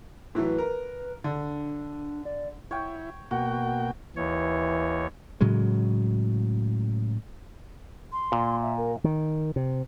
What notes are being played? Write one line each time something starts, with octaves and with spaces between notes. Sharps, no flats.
A2 E3 F#3 B4
A#4
D3 D4
D5
E4 C#5 G5
B2 A#3 F#4 G5
D#2 E3 C#5
A2 C#3 F#3 G#3
C6
A#2
E5
A#4
D#3
C3